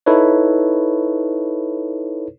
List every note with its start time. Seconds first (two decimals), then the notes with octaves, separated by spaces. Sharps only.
0.06 D#4 E4 A4 B4 C#5